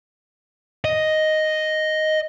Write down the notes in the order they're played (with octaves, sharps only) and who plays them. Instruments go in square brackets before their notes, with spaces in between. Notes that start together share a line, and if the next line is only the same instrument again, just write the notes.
[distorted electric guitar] D#5